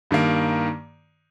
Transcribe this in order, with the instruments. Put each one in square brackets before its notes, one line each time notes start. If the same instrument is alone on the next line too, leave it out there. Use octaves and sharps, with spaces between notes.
[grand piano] G2 D#3 A#3